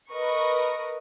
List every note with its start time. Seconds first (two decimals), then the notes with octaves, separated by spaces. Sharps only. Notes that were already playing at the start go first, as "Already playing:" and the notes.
0.12 A#4 B4 D#5 C#6